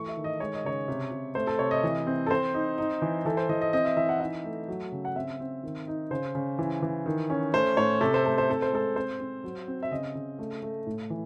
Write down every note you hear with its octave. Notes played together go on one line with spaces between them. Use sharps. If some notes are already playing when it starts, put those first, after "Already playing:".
Already playing: E3 A3 C#6
E5
D#3
D#5
G#3 C#5
D#5
C#3 C#5
C3
C3
A3 C5
A4
C3 C#5
D#5
E3
C4
A4
C4 C5
D#4
D#4
E3
E3 A4
C5
E3 D#5
D#5
C4 D#5
E5
E3 E5
F#5
D#4 E5
A3
F#3
C#3
F#5
C4 E5
C4
D#3
D#4
C#3 C5
C#3
E3
E3
D#3
C#4
A3 C5
A2 C#5
C3 A4
C5
A3 A4
C5
C4 A4
C5
G#3 A4
C4 C5
C4
F#3
C4
E5
C#3 D#5
C#3
A3
A3
A2
E3